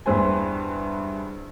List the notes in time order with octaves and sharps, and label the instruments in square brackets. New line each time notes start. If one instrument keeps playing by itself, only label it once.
[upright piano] E2 G2 B4 C5 G#5